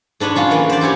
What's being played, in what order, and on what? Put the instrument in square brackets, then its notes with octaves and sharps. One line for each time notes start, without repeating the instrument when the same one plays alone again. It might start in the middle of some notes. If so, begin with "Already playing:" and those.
[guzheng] G#2 D4 B4 C#5
F#3 C#4 F4 F#4
E3 F#3 A#3
C5 D5
C#4 E4 G4 C#5